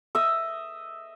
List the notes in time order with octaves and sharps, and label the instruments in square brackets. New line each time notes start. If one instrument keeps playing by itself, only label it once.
[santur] D#5 E5